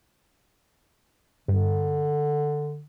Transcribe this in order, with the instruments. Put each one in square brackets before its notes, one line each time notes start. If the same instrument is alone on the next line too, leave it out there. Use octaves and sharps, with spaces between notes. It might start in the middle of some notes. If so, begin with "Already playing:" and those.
[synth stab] G2 [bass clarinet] D3